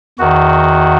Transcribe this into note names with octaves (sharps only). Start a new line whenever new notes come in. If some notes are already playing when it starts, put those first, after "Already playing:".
E2 D#3 F#4